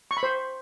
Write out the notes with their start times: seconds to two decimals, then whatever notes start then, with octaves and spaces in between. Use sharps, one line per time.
0.11 C#6
0.17 B5
0.23 C5